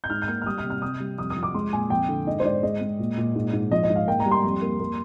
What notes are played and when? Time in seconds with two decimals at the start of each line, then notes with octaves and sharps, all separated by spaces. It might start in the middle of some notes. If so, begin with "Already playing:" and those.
0.04 G6
0.10 G#2 F6
0.22 G6
0.28 A#3 F6
0.42 F6
0.46 G3 D#6
0.58 F6
0.64 C3
0.70 F6
0.82 C3 D#6
1.00 G3
1.18 F2 D#6
1.30 D#6
1.36 F3
1.43 D6
1.54 G#3 C6
1.73 A#2 G#5
1.90 F2 G5
2.09 D3
2.27 G#2 D#5
2.40 C5
2.45 G#2 D5
2.63 G#3 D#5
2.81 G#3
2.99 A#2
3.17 A#2
3.35 G#2
3.53 G#2
3.71 F3 D#5
3.84 D#5
3.90 G#2
3.96 F5
4.07 A#3 G5
4.20 A#5
4.26 G3
4.31 C6
4.44 F2
4.62 A#3
4.80 A#3